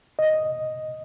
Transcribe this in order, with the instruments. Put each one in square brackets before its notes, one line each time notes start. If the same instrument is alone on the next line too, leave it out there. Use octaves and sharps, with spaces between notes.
[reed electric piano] D#5